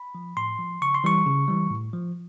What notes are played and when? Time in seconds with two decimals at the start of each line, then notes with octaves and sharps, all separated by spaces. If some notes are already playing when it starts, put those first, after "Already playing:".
Already playing: B5
0.15 F3
0.37 A2 C6
0.59 F3
0.81 C#3 C#6
0.95 C6
1.04 E3 G3 C#6
1.26 C#3
1.48 E3 G3
1.70 A2
1.93 F3